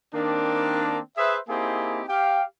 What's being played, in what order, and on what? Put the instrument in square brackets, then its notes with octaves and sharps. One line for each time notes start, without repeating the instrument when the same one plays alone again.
[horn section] D#3 A#3 C4 D4
G#4 B4 C5 E5
A#3 C4 D#4 E4 G4 G#4
G4 F5 G5